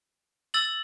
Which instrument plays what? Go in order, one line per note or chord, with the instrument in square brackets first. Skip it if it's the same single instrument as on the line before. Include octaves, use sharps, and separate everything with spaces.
[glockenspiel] E6 A6 F#7